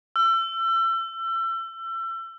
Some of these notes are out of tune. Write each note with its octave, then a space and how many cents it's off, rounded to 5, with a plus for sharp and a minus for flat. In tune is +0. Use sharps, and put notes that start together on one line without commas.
E6 +35